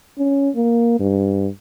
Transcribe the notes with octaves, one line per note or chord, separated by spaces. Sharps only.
C#4
A#3
G2